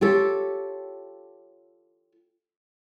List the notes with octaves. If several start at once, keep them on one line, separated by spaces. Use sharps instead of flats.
F4 G4 A4 C#5